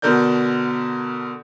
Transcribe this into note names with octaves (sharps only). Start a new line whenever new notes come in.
B2 D3 A#4 D5 G6